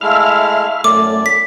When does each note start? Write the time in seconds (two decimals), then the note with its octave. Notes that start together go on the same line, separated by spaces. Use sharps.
0.01 G#3 A3 E4 E5 F5 F6
0.84 F#2 A2 A3 D5 D6
1.26 B6